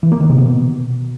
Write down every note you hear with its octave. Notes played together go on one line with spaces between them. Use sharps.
E3
A#3
D#3
C3
B2